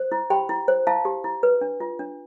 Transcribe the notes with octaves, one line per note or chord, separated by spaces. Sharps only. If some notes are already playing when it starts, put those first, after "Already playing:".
Already playing: C5
E4
G4 G5 B5
E4
C5
E4 F5 A5
G4
E4
B4
D4
F4
D4